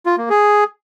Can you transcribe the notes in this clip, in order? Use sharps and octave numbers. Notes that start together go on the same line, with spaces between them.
F4
A#3
G#4